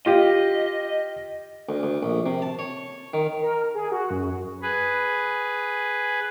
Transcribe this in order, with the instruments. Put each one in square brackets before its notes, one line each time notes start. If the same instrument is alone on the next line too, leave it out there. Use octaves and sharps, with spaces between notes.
[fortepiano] F4 G4 [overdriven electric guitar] D#5
[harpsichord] D2
D2
A#1
C3
A5
C#5
D#3
[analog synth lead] A#4
G#4
F#4
F#2
[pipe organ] G#4 B4